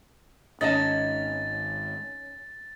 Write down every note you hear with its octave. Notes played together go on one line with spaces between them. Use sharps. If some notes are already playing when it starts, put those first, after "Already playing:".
G#1 C#4 D#4 D#5 A5 A6